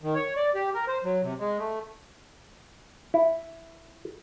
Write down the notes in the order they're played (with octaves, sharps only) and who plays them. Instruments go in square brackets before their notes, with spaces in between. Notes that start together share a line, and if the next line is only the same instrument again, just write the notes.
[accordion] D#3
C#5
D5
G4
A#4
C5
F#3
C3
G#3
A3
[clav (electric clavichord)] E4